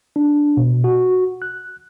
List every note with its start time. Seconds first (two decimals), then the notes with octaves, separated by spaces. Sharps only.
0.16 D4
0.57 B2
0.84 F#4
1.42 F#6